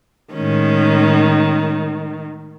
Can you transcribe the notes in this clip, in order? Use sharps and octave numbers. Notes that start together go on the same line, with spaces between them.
A2 D#3 G#3 C#4